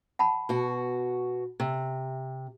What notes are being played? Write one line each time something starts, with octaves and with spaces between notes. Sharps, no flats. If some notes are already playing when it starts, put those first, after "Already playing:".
F#5 A5 B5
B2 F#4
C3